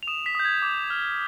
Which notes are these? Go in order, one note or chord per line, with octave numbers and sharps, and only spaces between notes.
F7
D#6 E7
B6
D#6 G6
G#6
D6
F6